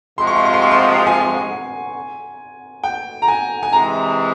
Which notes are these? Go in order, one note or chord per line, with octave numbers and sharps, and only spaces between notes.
C3 F3 G#3 C6
C#6
C6
C#6
C6
C#6
C6
G#5
G5
A#5
G#5
G#5
C3 E3 G#3 A#5